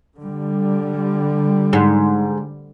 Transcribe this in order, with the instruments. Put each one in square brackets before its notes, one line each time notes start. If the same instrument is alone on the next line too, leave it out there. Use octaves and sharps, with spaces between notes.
[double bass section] D3 G3
[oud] G#2